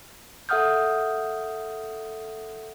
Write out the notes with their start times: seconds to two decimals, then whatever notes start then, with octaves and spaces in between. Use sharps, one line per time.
0.49 A4 E5 F#5 D#6 F6 G6